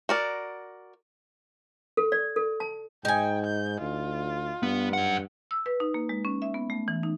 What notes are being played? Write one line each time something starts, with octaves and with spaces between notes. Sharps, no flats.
F#4 A#4 D5
A4
D5
A4
A5
G#2 D#4 G5 G#5
G6
D2 F4
G2 B3
F#2 F#5
E6
B4
D#4
A#3
G#3
C#4
E5
B3
A3
E3
D#4